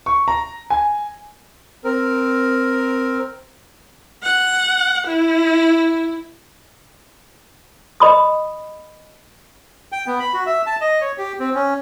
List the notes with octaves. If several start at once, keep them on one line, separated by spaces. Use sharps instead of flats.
C#6
A#5
G#5
C4 A#4
F#5
E4
D#5 B5 D#6
G5
B3
B5
F#4
E5
A5
D#5
C#5
G4
C4
C#4